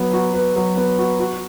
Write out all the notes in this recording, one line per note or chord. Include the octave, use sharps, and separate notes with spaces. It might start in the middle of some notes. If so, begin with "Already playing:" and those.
Already playing: F#3 B3
F#4
B4
F#3
B3
F#4
F#4